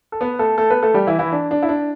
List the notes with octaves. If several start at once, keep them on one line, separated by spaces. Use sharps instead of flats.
A4
B3 B4
A3 A4
A3 A4
B3 B4
A3 A4
G3 G4
E3 E4
E3 E4
D4
D4
E4
D4